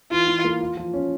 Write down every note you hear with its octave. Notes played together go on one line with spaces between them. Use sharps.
E3 F4
E3
A#3
F4
F3
C#4